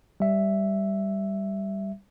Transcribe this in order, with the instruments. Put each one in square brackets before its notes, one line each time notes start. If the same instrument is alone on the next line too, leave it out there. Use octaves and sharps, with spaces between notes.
[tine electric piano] G3 E5